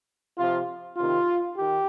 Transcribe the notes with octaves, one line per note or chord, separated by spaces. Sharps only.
C3 F3 F4
C3 D#3 F4
D#3 G4